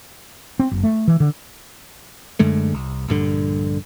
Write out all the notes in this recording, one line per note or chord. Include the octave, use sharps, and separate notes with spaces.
C4
F#1
A3
E3
D3
F#2 D3 G#3 A3
C2
A#1 G2 D3